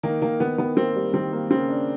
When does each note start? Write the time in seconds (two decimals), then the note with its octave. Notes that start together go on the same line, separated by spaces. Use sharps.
0.03 D#3 A#3
0.22 D#3 A#3
0.40 D#3 B3
0.58 D#3 B3
0.77 A#3 C4
0.96 G3
1.14 D#3 C4
1.33 A#3
1.51 C#3 C4
1.69 D4